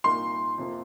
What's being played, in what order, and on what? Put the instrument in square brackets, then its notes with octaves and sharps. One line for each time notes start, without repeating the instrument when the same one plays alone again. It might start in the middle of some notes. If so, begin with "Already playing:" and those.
[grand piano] C2 A#2 A#3 D#4 A#4 [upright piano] C6
[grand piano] F2 C3 F3 A#3